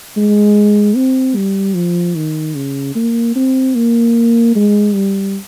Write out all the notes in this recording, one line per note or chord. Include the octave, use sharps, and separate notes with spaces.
G#3
C4
G3
F3
D#3
C#3
A#3
C4
A#3
G#3
G3